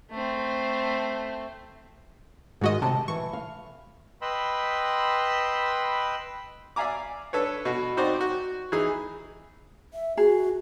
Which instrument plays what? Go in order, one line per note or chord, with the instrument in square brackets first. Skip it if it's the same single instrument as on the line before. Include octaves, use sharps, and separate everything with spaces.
[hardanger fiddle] A3 C4
[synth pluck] G#2 F#4 D#5 [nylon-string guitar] D#3 G#3
[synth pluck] C3 [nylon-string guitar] A5
[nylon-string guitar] E3 [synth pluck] C#6
[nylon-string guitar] F5
[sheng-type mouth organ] B4 D#5 G5 B5 C6 E6
[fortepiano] D5 E5 F5 G#5 A#5 D6
D4 A4 B4 C#5
B2 F#4
C4 D#4 F#4 C5 D5
F#4
E3 D#4 G#4
[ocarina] E5
[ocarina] F#4 [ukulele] G#4